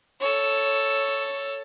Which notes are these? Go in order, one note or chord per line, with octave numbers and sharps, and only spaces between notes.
A4 C#5